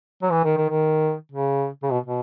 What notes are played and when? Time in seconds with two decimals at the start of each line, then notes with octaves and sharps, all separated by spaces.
0.22 F#3
0.31 E3
0.44 D#3
0.57 D#3
0.69 D#3
1.32 C#3
1.83 C#3
1.91 B2
2.06 B2